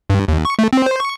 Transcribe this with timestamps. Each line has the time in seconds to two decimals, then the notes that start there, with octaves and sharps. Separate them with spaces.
0.10 G2
0.28 D#2
0.45 C#6
0.59 A3
0.73 C4
0.86 C5
1.00 C#6